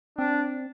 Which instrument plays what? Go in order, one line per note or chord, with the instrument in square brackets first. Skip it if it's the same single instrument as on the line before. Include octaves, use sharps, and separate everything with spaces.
[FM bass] C4 [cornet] D4